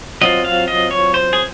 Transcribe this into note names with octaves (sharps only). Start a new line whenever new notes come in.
F#3 C4 F4 D#5
F5
D#5
C#5
C5
G#4